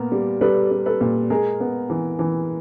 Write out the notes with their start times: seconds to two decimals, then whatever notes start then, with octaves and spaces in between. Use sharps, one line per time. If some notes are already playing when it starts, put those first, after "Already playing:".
Already playing: A#2 B3 A#4
0.12 G3
0.41 G3 A4 B4
0.71 G3
0.86 A4 B4
1.01 A#2
1.30 G#3 G#4 A#4
1.60 B3
1.90 E3
2.19 E3